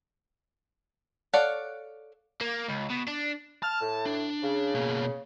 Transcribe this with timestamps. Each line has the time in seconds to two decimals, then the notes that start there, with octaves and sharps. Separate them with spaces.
1.33 A4 C#5 D5 F5 F#5
2.41 A#3
2.68 C#2
2.90 B2
3.08 D4
3.63 A5 F6
3.81 A2
4.06 D4
4.43 C#3
4.74 B2 A#3